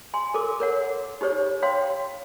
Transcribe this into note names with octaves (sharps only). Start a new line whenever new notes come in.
G#5 C6
A4 A#4 D6
A#4 C#5 F#5
D#4 G4 C5 C#5
C#5 F5 G5 C6